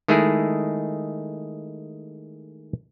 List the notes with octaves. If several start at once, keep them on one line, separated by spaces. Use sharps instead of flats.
D#3 G#3 A3 E4 G#4